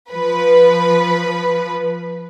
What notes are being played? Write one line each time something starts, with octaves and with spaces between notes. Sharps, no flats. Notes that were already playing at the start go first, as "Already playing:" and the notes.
F3 B4